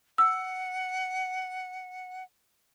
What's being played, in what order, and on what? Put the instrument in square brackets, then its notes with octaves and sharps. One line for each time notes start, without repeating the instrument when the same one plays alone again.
[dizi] F#5 [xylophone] E6